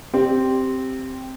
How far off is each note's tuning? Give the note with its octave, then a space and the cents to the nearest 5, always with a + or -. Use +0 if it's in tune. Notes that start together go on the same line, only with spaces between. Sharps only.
C4 +0 G4 -5